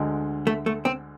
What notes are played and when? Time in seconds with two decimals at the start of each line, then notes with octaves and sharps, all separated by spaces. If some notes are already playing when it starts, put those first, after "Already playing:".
Already playing: D2 D3 G#3
0.47 A3
0.66 A3
0.85 C4